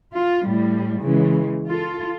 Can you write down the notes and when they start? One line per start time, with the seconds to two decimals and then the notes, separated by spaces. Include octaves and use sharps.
0.14 F4
0.46 A2 G3
1.02 C#3 E3 G#3
1.67 F4 A4